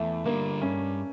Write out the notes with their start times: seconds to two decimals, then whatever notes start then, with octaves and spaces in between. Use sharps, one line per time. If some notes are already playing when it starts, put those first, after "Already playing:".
Already playing: E2 A3
0.25 D3 G3 A#3 D4
0.61 G2 C#4